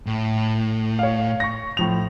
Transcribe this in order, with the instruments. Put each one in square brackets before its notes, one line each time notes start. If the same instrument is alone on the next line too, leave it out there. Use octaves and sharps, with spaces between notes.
[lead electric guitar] A2
[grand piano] C#5 F5
C#6 A#6
A2 F3 F7